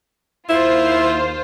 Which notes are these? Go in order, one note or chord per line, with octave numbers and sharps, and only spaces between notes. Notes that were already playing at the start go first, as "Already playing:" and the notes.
D#2 E4 F4 C5